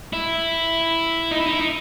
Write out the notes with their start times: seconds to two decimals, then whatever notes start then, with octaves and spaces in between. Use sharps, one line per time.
0.13 E4
1.31 D#4
1.38 E4
1.45 D#4
1.52 E4
1.60 D#4